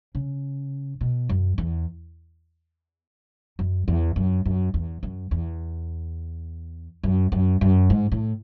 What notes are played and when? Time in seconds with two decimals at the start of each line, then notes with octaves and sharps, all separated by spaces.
0.15 C#3
1.01 B2
1.29 F#2
1.58 E2
3.59 F#2
3.88 E2
4.16 F#2
4.45 F#2
4.74 E2
5.03 F#2
5.31 E2
7.03 F#2
7.32 F#2
7.61 F#2
7.90 G#2
8.12 A2